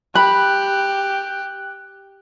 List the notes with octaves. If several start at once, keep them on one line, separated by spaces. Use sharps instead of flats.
G4 B5 F#6